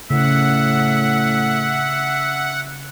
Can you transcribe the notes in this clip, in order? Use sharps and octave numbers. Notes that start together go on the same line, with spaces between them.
A2 C#3 E5 F#5